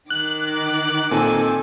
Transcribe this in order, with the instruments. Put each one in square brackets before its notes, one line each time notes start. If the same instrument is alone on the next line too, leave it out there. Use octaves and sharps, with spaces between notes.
[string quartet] D#3 D6 [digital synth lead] F#6
[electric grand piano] A#2 C4 D#4 [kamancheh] A4 G#5